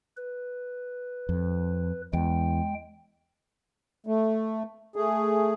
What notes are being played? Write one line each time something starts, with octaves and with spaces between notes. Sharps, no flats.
B4
F2
E2 G#3 G5
A3
A3 G#4